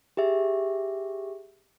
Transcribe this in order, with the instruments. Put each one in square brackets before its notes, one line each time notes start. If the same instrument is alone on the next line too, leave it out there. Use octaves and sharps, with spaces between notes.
[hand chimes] G4 G#4 E5